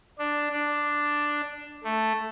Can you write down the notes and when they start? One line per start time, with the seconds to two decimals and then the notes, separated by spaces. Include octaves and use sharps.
0.19 D4
0.52 D4
1.84 A3